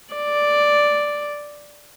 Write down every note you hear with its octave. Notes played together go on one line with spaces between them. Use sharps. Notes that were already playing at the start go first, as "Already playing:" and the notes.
D5